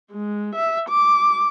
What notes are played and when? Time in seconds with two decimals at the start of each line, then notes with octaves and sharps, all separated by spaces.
0.12 G#3
0.55 E5
0.89 D6